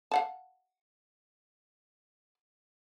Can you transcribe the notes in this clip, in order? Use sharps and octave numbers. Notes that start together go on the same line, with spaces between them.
F5 F#5 A5